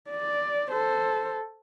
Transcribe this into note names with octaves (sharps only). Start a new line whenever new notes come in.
D5
A4 C5